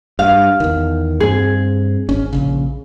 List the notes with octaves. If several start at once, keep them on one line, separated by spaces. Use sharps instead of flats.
G2 F5
E2 D#3
G2 C4 G#4
G#1 C#4
A#1 F#2 C#3